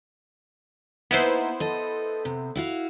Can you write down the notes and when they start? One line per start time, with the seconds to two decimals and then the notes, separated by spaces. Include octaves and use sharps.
1.11 A#3 B3 D#4 E4 C5
1.60 A4 D#5
2.25 C3
2.56 E4 F#4 F5